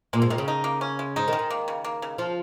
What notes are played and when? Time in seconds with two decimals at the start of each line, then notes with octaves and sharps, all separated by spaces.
0.13 A#2 G#3
0.22 G#2
0.30 A#2 D#3
0.38 C#3
0.48 D#4
0.64 A#3
0.81 C#4
0.99 G#3
1.16 G#2 D#4
1.28 D#3
1.33 G#3
1.39 D#3
1.50 A#3
1.68 C#3
1.84 A#3
2.02 C#3
2.18 F3 F4